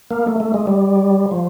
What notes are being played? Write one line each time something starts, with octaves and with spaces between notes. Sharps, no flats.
A#3
A3
A3
G#3
G3
F3